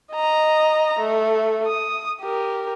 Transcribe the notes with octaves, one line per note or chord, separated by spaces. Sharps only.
D#5 A#5
A3
D#6
G4 A#4